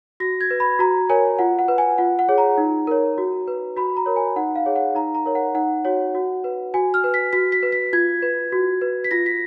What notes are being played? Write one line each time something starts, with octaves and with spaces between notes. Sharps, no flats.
F#4 A#6
G#6
B4
B5
F#4 A#5
A#4 C#5 G#5
F4 F#5
F#5
B4
G#5
F4 F#5
F#5
G#4 C#5
A#5
D#4
A#4 C#5
F#4
B4
F#4 B5
A#5
A#4 C#5
G#5
D#4 F#5
F5
G#4 C#5
F#5
D#4 A#5
A#5
A#4 C#5
F#5
D#4 F#5
F#4 C#5
F#4
B4
F#4 G#5
F6
B4
B6
F#4 B6
B6
B4
B6
F4 G#6
B4
F#4
B4
B6
F4 A#6
B6